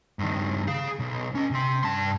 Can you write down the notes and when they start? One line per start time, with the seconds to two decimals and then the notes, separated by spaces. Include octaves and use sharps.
0.19 G2 D#3
0.68 G#4 F5
0.99 B1
1.35 C#4 D#5
1.51 C3 C6
1.84 G2 A5